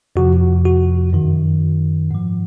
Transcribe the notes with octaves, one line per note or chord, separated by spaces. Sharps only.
F2 C3 F3 F#4
F#4
F#2 D#3
G#2 F3